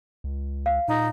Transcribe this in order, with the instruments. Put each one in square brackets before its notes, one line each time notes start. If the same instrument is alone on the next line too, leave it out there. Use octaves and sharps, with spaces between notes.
[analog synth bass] C#2
[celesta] F5
[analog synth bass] A#2 [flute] D#4